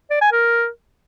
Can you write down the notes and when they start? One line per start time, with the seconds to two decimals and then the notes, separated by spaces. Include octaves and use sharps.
0.10 D5
0.21 G#5
0.32 A#4